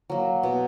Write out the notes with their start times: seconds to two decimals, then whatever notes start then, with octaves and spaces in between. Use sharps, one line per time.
0.10 F#3 A#3
0.43 B2